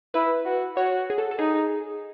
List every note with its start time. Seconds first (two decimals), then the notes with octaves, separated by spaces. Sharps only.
0.14 E4 B4
0.46 F#4
0.77 F#4 C#5
1.10 G#4
1.18 A4
1.31 A4
1.39 D#4 G#4